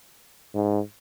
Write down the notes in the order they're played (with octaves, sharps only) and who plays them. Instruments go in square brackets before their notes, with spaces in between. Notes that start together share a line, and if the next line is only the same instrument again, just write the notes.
[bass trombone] G#2